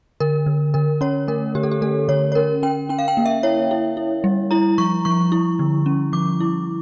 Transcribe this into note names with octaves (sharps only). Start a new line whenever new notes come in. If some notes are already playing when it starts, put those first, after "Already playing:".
D3 A#4
D3
D3 A#4
C#4 C#5
A3 A#4
D3 G4
A4
G4
A3 A4
D3 C#5
C#5
C#4 A#4
C#4 G5
C#4 G5
F5
G5
A#3
E5
E4 C#5
E4
E4
G3
E4 A#5
F3 C#6
F3 C#6
E4
D3
C#4
F3 D6
E4